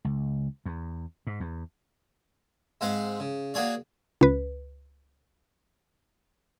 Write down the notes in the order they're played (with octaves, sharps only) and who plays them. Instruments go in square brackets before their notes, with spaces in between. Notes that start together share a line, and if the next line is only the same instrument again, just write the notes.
[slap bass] C#2
E2
G#2
E2
[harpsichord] G#2 G#3 C4 C5 F5 F#5
C#3
A#3 F#4 G#4 C#5 D5
[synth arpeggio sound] C#2 B4